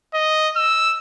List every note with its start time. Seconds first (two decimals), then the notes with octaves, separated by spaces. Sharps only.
0.14 D#5
0.56 E6